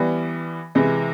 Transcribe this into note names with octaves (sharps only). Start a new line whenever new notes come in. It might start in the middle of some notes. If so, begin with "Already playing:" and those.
Already playing: E3 G3 B3
C3 E3 G#3